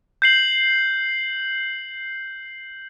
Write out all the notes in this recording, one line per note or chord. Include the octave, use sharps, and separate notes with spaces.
G6 C7 F#7